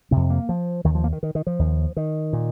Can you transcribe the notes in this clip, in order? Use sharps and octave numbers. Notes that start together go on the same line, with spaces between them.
F2 C3 C4
A#3
F3
D#2 D#3
F3
A#3
D#3
D#3
D#3
F3
D#2
D#3
A#2